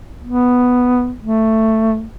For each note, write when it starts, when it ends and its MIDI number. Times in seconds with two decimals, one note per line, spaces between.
0.25 1.13 59
1.21 2.04 57